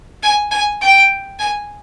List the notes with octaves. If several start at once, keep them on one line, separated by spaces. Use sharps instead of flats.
G#5
G#5
G5
G#5